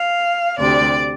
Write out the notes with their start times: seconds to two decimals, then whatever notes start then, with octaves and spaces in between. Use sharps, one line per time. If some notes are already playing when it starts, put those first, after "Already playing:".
Already playing: F5
0.59 D2 C3 G3 D5